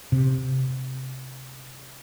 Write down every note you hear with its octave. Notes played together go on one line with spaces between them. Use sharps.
C3